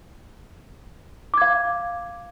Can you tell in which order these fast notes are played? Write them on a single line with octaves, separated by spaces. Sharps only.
D6 G#6 F5